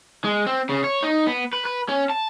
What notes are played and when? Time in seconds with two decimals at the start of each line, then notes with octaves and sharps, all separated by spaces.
0.24 G#3
0.46 C4
0.69 C#3
0.84 C#5
1.02 D#4
1.27 B3
1.53 B4
1.65 B4
1.89 C#4
2.10 A5